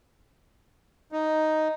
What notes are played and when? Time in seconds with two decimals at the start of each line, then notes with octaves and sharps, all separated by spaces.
1.12 D#4